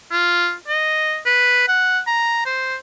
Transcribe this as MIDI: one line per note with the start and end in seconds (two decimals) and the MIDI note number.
0.11 0.54 65
0.68 1.18 75
1.26 1.67 71
1.68 2.00 78
2.07 2.42 82
2.46 2.76 72